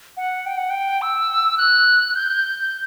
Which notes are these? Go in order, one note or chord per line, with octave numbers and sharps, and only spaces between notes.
F#5
G5
F#5
G5
E6
F#6
G6